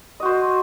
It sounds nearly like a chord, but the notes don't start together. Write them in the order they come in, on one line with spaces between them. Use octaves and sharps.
D#5 F#4 C5